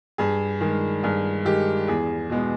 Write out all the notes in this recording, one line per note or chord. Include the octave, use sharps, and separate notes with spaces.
G2 G#4
D#3 G#3
G2 G#4
D#3 G#3 G4
E2 G#4
B2 G#3 B3